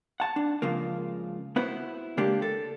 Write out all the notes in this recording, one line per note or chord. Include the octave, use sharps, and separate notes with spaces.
F#5 A5
D4
C#2 C#3 F3 A#3
B3 E4 F#4 B4 C5
C#3 G#3 A#3 D4 G4
A4